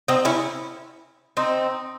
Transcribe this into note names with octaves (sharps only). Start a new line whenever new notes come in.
C4 D#4
C#4 E4
C4 D#4